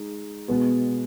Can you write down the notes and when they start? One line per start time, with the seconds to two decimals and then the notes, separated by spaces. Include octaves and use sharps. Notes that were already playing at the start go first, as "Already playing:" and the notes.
Already playing: G#3 D#4
0.48 B2 G#3 B3